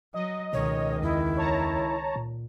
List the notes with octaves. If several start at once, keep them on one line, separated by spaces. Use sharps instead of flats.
F#3 D#5
C#2 B2 D#3 C#5
E2 E4
C#5 A5 A#5
A#2